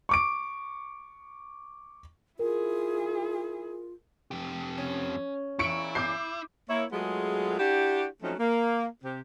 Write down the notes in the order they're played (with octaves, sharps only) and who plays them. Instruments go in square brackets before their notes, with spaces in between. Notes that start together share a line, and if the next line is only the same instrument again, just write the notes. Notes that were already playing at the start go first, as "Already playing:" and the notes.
[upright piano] C#6 D6 D7
[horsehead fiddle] E4 G#4 [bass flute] F4 [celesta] A#4
[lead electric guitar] F2 G4
[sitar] C#4
[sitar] E2 A#2 [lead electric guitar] E4 [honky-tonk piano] C#6 C#7 D7
[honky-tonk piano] D6 G6 C7
[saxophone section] A#3 E4 C#5
F#3 G#3 A3 B3 F4 G#4
D4 E4 F#4 G4
F3 F#3 A3 C4 C#4 D#4
A#3
C3 C4 G4